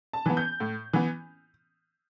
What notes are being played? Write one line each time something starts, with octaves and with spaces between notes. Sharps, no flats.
A5
E3 B3
G6
A2
E3 B3